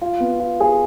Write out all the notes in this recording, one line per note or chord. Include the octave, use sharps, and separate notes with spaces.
F4
B3
F4
G#4